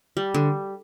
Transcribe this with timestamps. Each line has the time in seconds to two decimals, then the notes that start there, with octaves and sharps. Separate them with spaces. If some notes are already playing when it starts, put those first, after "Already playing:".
0.17 G3
0.34 D3